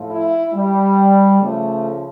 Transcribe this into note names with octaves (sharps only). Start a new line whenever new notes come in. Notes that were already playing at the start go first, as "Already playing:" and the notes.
Already playing: A2 F3
E4
G3
C#3 F3 A3